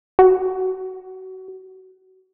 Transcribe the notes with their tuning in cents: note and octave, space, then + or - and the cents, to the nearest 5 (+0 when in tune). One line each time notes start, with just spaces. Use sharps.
F#4 +25